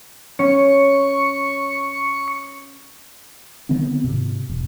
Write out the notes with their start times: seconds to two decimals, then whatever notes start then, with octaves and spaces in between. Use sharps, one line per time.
0.39 C#4 C#6
3.69 D3 D#3 B3 C4
4.04 G#2 C3
4.49 E1